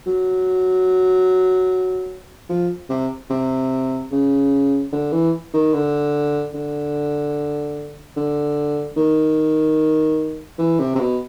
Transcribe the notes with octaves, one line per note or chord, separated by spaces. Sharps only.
F#3
F3
C3
C3
C#3
D3
E3
D#3
D3
D3
D3
D#3
E3
C3
C3
B2